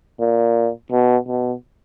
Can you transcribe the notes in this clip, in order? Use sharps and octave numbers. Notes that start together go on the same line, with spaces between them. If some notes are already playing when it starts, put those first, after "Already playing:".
A#2
B2
B2